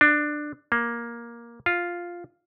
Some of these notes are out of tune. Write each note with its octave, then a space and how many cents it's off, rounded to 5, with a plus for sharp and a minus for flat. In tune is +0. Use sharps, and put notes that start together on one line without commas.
D4 +15
A#3 +10
F4 +0